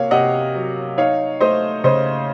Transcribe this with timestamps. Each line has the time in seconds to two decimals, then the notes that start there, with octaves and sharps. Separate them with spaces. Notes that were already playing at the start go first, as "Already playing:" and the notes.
Already playing: C3 A#3 C#5 F5
0.11 C3 D#5 F#5
0.55 F#3
0.98 D#4 C#5 F5
1.40 A3 C5 D#5
1.84 C#3 C5 D#5